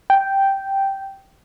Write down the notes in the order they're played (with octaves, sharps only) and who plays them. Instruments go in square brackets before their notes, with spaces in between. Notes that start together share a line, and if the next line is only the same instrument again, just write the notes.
[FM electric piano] G5